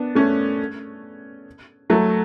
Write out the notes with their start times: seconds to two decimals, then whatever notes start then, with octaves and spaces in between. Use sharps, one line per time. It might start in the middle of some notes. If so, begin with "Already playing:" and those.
Already playing: B3 D4
0.15 A3 C#4
1.90 F#3 A3